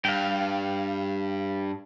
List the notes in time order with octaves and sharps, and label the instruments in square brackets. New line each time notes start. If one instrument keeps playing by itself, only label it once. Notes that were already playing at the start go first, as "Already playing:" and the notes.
[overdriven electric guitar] G2 [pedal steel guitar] F5 G5